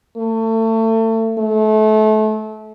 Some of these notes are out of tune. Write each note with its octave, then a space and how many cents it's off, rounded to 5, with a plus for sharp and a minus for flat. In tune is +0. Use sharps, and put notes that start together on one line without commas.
A3 +30
A3 -30